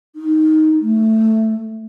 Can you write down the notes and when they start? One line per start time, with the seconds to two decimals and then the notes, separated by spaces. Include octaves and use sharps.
0.16 D#4
0.81 A3